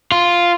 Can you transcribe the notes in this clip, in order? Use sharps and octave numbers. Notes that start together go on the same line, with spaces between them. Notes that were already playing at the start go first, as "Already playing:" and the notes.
F4